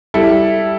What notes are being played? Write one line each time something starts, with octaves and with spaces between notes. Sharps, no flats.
G3 E4 A4